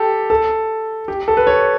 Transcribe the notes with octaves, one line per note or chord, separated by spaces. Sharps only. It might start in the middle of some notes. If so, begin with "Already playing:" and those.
Already playing: G4 A4
A4
G4
A4
B4
C#5